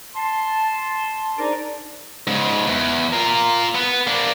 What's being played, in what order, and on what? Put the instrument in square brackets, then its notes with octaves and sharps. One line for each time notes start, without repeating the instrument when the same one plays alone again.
[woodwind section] A5 C6
D4 D#4 G#4 A#4 C5 D5
[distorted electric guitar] G#2 C#3
E2
F4 A#4
B3
A#3 D4